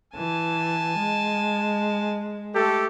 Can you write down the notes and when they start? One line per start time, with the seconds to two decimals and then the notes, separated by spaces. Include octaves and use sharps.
0.15 E3 G#5 A5
0.97 G#3
2.55 A3 G4 A4